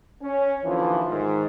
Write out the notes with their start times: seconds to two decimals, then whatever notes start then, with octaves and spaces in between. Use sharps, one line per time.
0.21 C#4
0.64 D#2 D3 E3 F3 F4
1.10 G#2 D#3